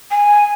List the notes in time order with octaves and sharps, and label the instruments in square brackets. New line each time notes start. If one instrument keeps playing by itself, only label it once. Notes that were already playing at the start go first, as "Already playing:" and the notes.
[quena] G#5